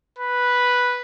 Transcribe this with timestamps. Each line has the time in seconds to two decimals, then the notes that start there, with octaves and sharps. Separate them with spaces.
0.19 B4